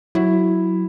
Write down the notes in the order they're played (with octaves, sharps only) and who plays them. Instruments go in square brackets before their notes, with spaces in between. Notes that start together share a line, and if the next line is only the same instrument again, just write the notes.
[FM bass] F#3 [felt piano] E4